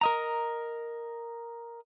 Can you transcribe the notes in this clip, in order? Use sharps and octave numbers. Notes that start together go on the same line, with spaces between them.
A#4 D#5 A#5